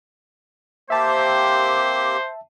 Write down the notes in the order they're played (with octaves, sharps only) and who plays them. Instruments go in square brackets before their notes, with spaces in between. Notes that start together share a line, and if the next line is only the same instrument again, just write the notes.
[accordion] A#3 C4 G4 [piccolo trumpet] C5 [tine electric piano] E5 A5